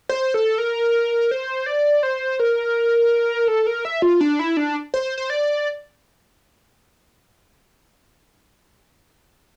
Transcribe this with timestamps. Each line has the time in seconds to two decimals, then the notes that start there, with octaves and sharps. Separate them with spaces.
0.09 C5
0.34 A4
0.58 A#4
1.31 C5
1.66 D5
2.03 C5
2.40 A#4
3.48 A4
3.67 A#4
3.85 E5
4.02 F4
4.21 D4
4.39 E4
4.57 D4
4.94 C5
5.18 C5
5.30 D5